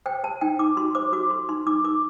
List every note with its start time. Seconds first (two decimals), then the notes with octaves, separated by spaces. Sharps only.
0.06 C5 G5
0.24 C5 A5
0.41 D#4 G5
0.59 D#4 D6
0.77 F#4 C6
0.95 C5 D6
1.13 F#4 D6
1.31 A4 C6
1.49 D#4 C6
1.67 D#4 D6
1.84 A#4 D6